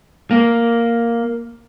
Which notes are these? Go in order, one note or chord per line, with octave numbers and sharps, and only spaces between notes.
A#3